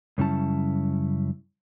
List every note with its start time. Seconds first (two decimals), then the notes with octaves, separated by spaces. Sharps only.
0.18 F#2 C#3 G3 C#4 E4 A5